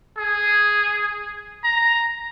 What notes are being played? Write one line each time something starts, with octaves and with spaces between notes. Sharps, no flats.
G#4
A#5